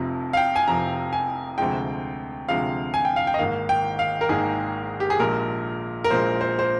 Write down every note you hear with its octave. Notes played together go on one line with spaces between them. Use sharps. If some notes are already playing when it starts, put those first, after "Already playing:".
Already playing: F1 F2 C3 F3
F5
G5
G#5
F1 F2 C3 F3 A#5
G#5
D2 C3 F3 G#3 G5
D2 C3 F3 G#3 F5
G#5
G5
F5
G5
D#5
G#1 G#2 D#3 A#3 F5
G5
F5
A#4
G#1 G#2 D#3 A#3 G#4
G4
G#4
A#1 A#2 G#3 A#4
A#4
A#1 A#2 G#3 C5
C5
C5